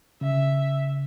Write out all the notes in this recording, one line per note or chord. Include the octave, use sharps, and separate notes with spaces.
C#3 E5